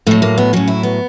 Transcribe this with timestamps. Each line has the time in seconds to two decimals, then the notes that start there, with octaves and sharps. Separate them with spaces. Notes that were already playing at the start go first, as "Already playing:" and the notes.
0.07 A2 F#3 A3
0.22 A#3
0.38 B3
0.53 A2 F#3 C#4
0.68 E4
0.83 B3